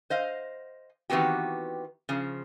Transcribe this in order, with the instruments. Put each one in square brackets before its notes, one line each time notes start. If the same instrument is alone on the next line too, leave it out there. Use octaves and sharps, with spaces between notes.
[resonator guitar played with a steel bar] C5 D#5 F5
D#3 E3 B3 C4 F#4 G4
C#3 F3